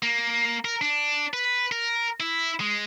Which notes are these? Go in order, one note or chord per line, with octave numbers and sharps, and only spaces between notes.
A#3
A#4
D4
B4
A#4
E4
G#3